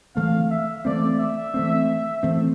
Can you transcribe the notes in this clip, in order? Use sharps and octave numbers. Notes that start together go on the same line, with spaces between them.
E3 A3 C4 F5
E5
E3 A3 C4 D5
E5
E3 A3 C4
E3 A3 C4